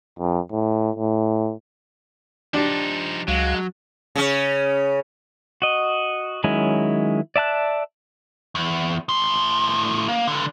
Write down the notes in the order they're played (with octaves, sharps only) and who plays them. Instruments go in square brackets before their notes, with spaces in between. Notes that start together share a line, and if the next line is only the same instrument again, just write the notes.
[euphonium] F2
A2
A2
[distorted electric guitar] F3 D#4 [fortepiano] D4 G4
[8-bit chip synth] C#2 F5 [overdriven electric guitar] F#3 [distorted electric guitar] G#3
[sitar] C#3 C#4
[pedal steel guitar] F#4 D#5
D#3 F#3 G#3 C#4 E4
D5 E5 A5 F#6
[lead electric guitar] E2
A2 C6
A#3
C#2 D3